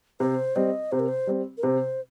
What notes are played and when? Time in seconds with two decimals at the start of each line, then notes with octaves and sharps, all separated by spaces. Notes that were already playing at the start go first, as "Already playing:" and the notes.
0.20 C3 C5
0.56 G3 C4 D#5
0.92 C3 C5
1.00 A#4
1.08 C5
1.27 G3 C4
1.58 A#4
1.63 C3 C5